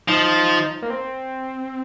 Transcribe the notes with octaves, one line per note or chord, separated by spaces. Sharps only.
F3 D#4
A#3
C4